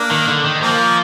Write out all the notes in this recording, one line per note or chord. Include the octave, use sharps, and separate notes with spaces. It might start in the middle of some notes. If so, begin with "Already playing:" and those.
Already playing: A#3 D4
D#3
D3
D#3
F3 A#3